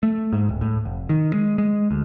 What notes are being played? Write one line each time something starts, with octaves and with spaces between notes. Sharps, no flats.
A3
G#2
D1
A2
F1
D#3
G#3
G#3
D2